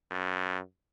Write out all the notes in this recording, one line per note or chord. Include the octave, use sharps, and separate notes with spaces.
F#2